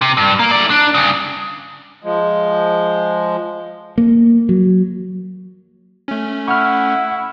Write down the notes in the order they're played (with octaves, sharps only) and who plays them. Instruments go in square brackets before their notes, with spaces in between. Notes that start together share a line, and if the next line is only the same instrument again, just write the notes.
[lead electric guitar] C3
G2
A#3
E4 D5
D4
G2 C#3
[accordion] F3 G#3
[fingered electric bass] A#3
F#3
[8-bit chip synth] A3 C#4
[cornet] E4 [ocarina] F#5 [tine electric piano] C#6 F6